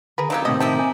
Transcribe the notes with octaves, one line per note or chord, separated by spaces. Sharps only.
D3 G#4 A#4 B4
F#3 A3 C#4 D#4 G4 F5 A5
A2 C3 D#3 C4 D#5
D#4 E4 G4 A5
G#5